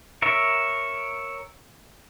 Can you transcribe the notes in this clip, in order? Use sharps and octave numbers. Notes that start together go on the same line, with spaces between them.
A#4 C#5 E5